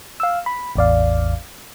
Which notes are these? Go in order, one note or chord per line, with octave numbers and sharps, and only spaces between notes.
F5 E6
B5
A1 E2 D5 F5